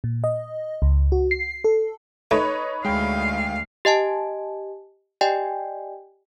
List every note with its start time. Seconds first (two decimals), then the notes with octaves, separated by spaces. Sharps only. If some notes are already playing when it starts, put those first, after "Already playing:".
0.04 A#2
0.24 D#5
0.82 C#2
1.12 F#4
1.31 C7
1.64 A4
2.31 A3 D#4 B4 C#5
2.85 D2 G#3 F5 G5
3.85 G4 D#5 G#5 A5
5.21 G4 D5 D#5 G5 G#5